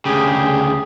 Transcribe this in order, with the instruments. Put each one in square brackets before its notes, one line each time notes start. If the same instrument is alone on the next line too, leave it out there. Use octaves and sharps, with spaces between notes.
[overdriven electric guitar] D2 C#3 [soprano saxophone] G4 [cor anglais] G#4